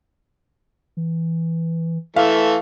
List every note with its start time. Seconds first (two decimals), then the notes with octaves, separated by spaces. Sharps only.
0.97 E3
2.16 E3 A3 F5